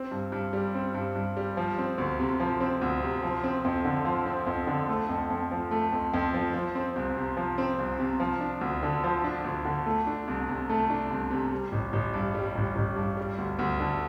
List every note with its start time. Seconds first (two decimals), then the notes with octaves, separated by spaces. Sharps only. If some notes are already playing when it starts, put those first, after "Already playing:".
Already playing: C4
0.11 G2
0.32 G2
0.53 G3
0.74 C4
0.94 G2
1.15 G2
1.37 G3
1.57 F3
1.78 C4
1.98 D2
2.20 C3
2.40 F3
2.60 C4
2.81 D2
3.02 C3
3.23 F3
3.44 C4
3.65 F2
3.85 D3
4.05 F3
4.26 C4
4.47 F2
4.67 D3
4.89 A3
5.09 F2
5.30 F2
5.51 F3
5.71 A3
5.92 F2
6.14 F2
6.34 F3
6.54 F3
6.75 C4
6.96 C2
7.17 C3
7.37 F3
7.58 C4
7.79 C2
7.99 C3
8.20 F3
8.40 D4
8.61 D2
8.83 D3
9.04 F3
9.24 D4
9.44 D2
9.65 D3
9.86 A3
10.07 D4
10.28 C2
10.48 C3
10.70 A3
10.90 D4
11.11 C2
11.30 C3
11.52 G3
11.72 A1
11.93 A1
12.14 G2
12.34 G3
12.55 A1
12.76 A1
12.96 G2
13.17 G3
13.38 D2
13.59 D2
13.80 D3